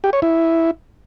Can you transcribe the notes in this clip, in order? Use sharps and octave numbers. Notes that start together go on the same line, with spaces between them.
G4
C#5
E4